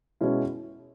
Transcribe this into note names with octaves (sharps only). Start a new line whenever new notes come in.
B2 G#3 C#4 E4